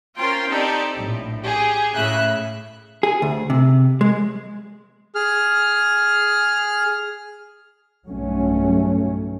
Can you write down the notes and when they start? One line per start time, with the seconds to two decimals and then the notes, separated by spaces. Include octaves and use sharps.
0.17 C#4 F4 A#4 C5 G5 C6
0.48 C4 D#4 G4 A4 D5
0.97 A#1 A2
1.43 G4 G#4
1.96 A2 C#3 E5 F#6
3.03 G#4
3.22 D2
3.50 C3
4.01 G#3
5.15 G#4 F6
8.08 B1 G2 F#3 A3 C#4